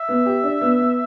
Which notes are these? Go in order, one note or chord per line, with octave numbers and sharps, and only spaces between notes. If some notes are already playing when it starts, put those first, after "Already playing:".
Already playing: E5
B3
G4
D4
B3
B3